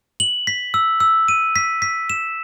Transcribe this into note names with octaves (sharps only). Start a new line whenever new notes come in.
F#7
B6
E6
E6
D#7
B6
B6
E7